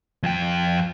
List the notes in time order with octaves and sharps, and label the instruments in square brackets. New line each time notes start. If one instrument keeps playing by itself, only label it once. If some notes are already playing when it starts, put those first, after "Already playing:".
[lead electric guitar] F2 G5